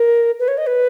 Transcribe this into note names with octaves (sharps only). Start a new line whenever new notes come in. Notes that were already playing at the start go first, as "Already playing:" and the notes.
Already playing: A#4
B4
C#5
D#5
B4